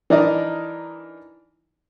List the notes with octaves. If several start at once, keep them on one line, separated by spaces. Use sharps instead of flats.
E3 D4 D#4 A#4 D5 D#5